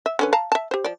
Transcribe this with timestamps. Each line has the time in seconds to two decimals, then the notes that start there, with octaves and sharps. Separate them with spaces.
0.06 E5
0.19 D3 C#4 B4
0.33 F5 A5 A#5
0.52 E5 A5
0.71 G4 C5
0.84 F3 D5